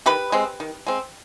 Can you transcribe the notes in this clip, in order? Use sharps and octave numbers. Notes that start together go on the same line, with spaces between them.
D#3 G4 B4
G#3 C4
D#3
G#3 C4